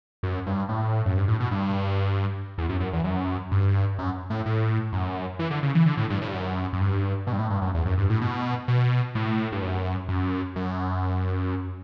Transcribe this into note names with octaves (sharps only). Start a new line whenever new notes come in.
F#2
G2
A2
F#2
G2
A2
B2
G2
E2
F#2
F#2
E2
F#2
G2
F#2
A2
A2
F#2
E3
D3
C#3
E3
D3
A2
G2
A2
G2
F#2
F#2
G2
B2
G2
A2
G2
F#2
E2
F#2
G2
A2
B2
B2
A2
G2
F#2
F#2
F#2